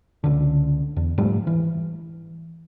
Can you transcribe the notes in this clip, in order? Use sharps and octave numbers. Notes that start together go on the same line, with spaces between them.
C#2 D3
E2
G#2 F3 G3 A3
E3